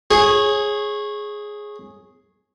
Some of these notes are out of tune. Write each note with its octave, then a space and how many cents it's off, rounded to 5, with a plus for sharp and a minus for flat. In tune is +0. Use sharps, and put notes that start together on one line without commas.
G#4 +5 C#5 -20